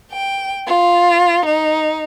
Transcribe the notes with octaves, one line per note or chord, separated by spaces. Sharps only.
G5
F4
D#4